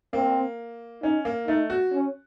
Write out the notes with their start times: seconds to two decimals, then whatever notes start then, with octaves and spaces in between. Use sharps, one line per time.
0.13 A#3 C4
1.03 C#4 D#4
1.25 A#3
1.48 A3 D#4
1.70 F#4
1.93 C#4